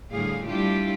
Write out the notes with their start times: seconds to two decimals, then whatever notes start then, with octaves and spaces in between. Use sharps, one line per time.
0.12 A2 D3 G3 G#4 F5
0.47 G3 A3 D4 E4 F4 G4